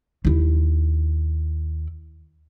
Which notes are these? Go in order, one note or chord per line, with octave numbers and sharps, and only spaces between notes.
D#2 E4